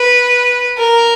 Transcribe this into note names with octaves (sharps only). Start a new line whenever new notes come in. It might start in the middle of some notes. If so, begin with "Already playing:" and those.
Already playing: B4
A#4